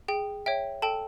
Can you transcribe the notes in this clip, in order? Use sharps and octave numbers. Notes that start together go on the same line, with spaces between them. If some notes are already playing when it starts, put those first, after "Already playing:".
G#4 G5
C#5 E5 G5
A4 G5 A5